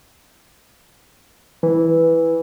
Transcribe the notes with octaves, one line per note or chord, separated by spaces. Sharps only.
E3